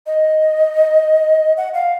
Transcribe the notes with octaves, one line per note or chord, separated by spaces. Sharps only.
D#5
F#5
F5